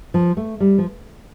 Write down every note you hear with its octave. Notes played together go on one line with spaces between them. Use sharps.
F3
A3
G3
F3